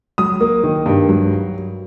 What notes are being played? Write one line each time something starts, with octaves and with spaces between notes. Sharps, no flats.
F#3 D#6
A#3
D#3
G2
F#3